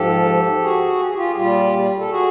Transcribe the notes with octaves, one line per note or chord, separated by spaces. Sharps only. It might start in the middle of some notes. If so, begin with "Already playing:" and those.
Already playing: G#2 F3 G4 A4
F#4 G#4
G4
G#4
F4 G4
G#4
A#2 G3 F4 G4
A4
F#4 G#4